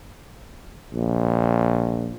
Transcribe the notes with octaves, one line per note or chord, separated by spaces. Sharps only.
A#1